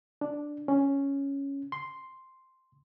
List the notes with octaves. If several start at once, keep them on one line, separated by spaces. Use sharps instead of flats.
D4
C#4
C6